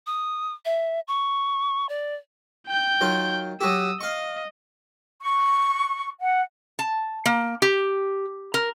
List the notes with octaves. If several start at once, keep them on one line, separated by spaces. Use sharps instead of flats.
D#6
E5
C#6
D5
G5 G6
D#3 F#3 F4
F#3 F#4 G4 D#6 E6
D#5 F5 C#6
C#6
F#5
A5
A#3
G4
A#4